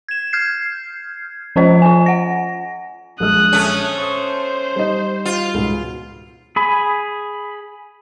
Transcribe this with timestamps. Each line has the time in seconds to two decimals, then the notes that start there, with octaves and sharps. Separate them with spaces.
0.08 G#6 E7
0.33 F6 G6 G#6 C7
1.56 F3 C#4 F4 C5 D#5
1.82 F4 G#5
2.06 F#5 A#6
3.20 A#1 G#3 D#6 F6 F#6
3.53 A3 C#4
3.98 C5 C#6 D#6
4.76 G3 D#4 D#5
5.25 F4
5.54 C#2 G#2 B2
6.56 G#4 B5